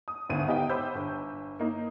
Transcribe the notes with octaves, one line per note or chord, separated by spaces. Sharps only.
D#6
G#1 D2 B3 D#7
B3 D#4 G4 D#5 F5 G5
C5 B5 D6 E6 G6
G1
A#3 D#4